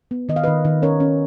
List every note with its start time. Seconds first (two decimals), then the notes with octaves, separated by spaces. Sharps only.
0.11 B3
0.29 D#3 D#5
0.36 F5
0.43 D#3 B4 D#5
0.65 D#3
0.82 C#4 A#4 C#5
1.00 C#4